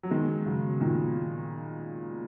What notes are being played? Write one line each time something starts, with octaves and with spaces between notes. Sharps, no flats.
F#3
D#3 G#3
C#3 F#3
A#2 D#3